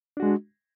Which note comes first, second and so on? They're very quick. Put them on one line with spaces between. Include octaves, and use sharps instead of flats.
D4 F#4 G#3